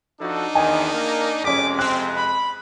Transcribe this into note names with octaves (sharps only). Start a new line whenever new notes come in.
F3 D4 D#4 F#4 A4
E2 D#3 D#5 G#5
A#3 A#4
F2 C3 G#3 C#4 G#4 D6 B6
C4 F#6
B5